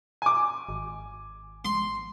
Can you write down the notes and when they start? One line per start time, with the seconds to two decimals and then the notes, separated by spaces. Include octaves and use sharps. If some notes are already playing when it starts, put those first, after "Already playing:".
0.22 G#5 D6
0.69 G#1
1.65 C6